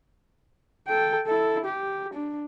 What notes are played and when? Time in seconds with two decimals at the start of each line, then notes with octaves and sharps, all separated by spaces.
0.88 A4 G5
1.27 E4 A4
1.65 G4
2.13 D4